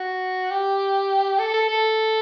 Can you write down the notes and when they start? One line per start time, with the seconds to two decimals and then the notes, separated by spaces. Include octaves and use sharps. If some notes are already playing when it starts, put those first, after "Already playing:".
Already playing: F#4
0.51 G4
1.39 A4
1.54 A4
1.68 A4